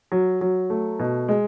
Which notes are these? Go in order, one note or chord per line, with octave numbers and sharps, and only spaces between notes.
F#3
F#3
A3
B2
G#3